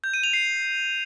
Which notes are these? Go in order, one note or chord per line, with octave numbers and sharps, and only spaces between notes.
G6
D#7
F7
C7